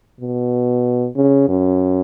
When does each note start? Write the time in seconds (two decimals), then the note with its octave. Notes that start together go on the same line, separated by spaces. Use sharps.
0.20 B2
1.16 C#3
1.48 F#2